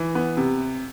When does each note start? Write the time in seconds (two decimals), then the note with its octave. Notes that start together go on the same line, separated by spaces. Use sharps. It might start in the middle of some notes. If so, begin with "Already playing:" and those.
Already playing: E3
0.15 B3
0.37 C3